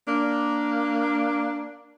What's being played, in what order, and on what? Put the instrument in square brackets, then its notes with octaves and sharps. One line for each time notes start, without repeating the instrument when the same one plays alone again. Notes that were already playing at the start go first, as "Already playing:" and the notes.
[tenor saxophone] A#3 [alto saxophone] D4